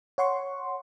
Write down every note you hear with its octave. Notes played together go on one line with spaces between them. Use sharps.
C#5 F#5 C6 C#6